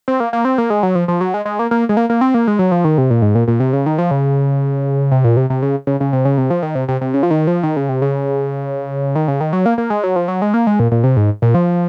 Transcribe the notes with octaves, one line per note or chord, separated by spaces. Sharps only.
C4
A#3
A#3
C4
A#3
G#3
F#3
F3
F3
F#3
G#3
G#3
A#3
A#3
G#3
A#3
A#3
C4
A#3
G#3
F#3
F3
D#3
C3
A#2
G#2
A#2
A#2
C3
C#3
D#3
F3
C#3
C3
A#2
C3
C3
C#3
C#3
C#3
C3
C#3
C3
F3
D#3
C3
C3
C3
C#3
F3
D#3
F3
D#3
C#3
C3
C#3
D#3
C#3
D#3
F#3
A#3
A#3
G#3
F#3
F3
F#3
G#3
A#3
G#3
A#2
A#2
C3
G#2
A#2
F3